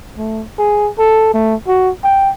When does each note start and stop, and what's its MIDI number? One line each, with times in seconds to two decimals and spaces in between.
0.18 0.44 57
0.59 0.90 68
0.99 1.31 69
1.34 1.55 57
1.68 1.91 66
2.04 2.31 79